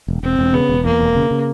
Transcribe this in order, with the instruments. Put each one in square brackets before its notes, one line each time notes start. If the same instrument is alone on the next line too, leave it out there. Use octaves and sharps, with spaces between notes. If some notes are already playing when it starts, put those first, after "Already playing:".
[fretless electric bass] E1
[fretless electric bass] E1 [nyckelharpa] C4
[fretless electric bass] E1
[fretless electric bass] C#3 [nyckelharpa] B3
[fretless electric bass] E1
[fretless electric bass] E2 [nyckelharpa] A#3
[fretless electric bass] E1
C#3
C#3